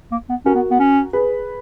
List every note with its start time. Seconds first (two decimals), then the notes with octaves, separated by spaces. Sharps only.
0.12 A#3
0.30 B3
0.46 C#4 F#4 A#4
0.55 B3
0.71 B3
0.80 C#4
1.13 G#4 B4